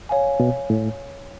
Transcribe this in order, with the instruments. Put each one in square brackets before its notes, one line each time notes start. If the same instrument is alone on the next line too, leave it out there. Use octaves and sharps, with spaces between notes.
[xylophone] C#5 F5 G#5
[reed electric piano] B2
A2